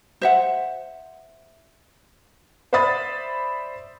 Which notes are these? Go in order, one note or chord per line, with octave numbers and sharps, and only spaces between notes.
C5 E5 F#5
C5 D5 E5 B5 D#6 A6